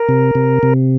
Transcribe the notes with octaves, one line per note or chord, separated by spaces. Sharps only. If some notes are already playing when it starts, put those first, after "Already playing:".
Already playing: A#4
C3
C3
C3